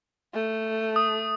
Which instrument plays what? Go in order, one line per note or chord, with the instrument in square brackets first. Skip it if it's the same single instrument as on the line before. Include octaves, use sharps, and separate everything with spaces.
[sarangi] A3
[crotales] D#6